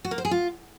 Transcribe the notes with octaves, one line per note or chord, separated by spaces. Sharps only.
F#4
A#3
C5
G#4
F4